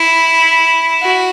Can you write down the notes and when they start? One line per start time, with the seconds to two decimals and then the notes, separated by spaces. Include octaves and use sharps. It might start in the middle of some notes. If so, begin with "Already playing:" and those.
Already playing: E4
1.02 F#4